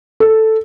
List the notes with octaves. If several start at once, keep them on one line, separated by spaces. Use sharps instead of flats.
A4